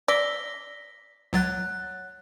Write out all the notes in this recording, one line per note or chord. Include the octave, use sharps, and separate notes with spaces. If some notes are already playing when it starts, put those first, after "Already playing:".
D5 E6 A#6 B6 G7
C#2 F#3 C#5 F#5 F#6 A6